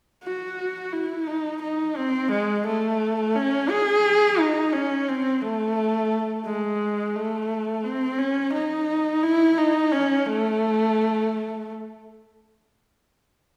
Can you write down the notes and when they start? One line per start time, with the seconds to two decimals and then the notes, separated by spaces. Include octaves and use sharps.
0.24 F#4
0.93 E4
1.28 D#4
1.62 D#4
1.97 C4
2.31 G#3
2.66 A3
3.36 C#4
3.70 G#4
4.39 D#4
4.73 C#4
5.08 C4
5.42 A3
6.46 G#3
7.16 A3
7.84 C4
8.19 C#4
8.53 D#4
9.23 E4
9.58 D#4
9.92 C#4
10.26 A3